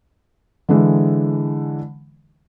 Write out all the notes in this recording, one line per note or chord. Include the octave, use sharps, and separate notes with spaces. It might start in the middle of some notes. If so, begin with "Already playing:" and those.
D3 E3 G#3